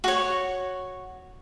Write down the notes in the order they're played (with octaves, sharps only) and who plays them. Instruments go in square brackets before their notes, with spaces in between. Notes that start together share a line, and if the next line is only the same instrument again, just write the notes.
[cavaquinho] F#4 C#5